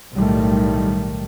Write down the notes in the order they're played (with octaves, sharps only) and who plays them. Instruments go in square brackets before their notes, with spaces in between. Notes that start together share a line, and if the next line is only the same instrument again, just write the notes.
[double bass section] B1 A2 D#3 G3 A3